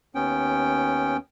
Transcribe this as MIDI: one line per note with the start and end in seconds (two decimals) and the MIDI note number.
0.15 1.17 39
0.15 1.17 59
0.15 1.17 61
0.15 1.17 79